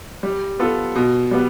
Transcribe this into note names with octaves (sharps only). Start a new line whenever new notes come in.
G3
B3 F4 A4
B2
G3 B3